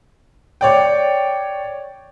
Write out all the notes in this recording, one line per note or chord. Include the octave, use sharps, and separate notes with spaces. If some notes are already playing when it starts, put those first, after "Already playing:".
C#5 D5 G5